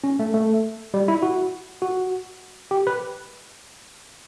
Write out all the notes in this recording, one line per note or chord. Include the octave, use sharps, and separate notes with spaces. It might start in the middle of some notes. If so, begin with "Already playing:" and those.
C#4
A3
A3
G3
E4
F#4
F#4
G4
B4